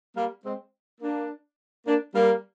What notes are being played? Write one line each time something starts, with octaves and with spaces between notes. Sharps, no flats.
G3 A#3
G#3 C4
A#3 D4
A#3 D4
G3 A#3